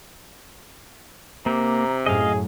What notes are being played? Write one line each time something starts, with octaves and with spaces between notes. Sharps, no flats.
C3 A#3 A#5
F#2 A2 G#4 D#5 F5